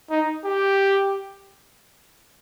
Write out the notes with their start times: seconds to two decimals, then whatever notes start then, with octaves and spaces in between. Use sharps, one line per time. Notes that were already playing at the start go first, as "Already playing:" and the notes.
0.10 D#4
0.45 G4